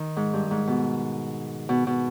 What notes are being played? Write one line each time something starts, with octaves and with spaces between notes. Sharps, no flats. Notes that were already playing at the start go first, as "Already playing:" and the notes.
Already playing: D#3
G#2
G2
G#2
B2
B2
B2